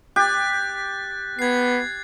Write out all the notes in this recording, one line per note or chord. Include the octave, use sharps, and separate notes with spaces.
G4 F#6 A6
B3 G#6 C7